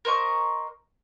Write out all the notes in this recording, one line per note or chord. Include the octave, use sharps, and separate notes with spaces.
A#4 C5 D#5 C#6